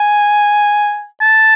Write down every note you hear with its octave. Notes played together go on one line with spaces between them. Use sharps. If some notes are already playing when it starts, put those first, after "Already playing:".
Already playing: G#5
A5